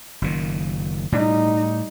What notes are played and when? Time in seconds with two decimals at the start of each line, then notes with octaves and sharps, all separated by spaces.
0.22 F#1 A#2 D#3
1.12 A2 G3 D#4